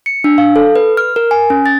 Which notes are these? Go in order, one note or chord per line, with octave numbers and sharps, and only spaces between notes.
C#7
D4
F5
A4
B4
F6
A#4
G#5
C#4
A6